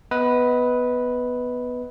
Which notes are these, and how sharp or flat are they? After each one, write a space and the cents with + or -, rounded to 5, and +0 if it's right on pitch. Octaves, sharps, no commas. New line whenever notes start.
B3 +0 B4 +0 D#5 +30